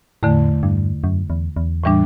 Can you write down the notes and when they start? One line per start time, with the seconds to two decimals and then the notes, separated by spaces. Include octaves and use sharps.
0.23 E2 A2 D3 A3
0.63 G2
1.04 F#2
1.30 E2
1.56 E2
1.84 A2 E3 G3 D4